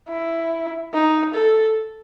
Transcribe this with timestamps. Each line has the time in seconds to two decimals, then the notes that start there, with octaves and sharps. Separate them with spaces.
0.08 E4
0.93 D#4
1.34 A4